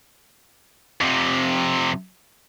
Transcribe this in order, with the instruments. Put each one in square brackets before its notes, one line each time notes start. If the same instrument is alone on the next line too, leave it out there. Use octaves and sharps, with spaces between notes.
[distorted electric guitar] F2 C3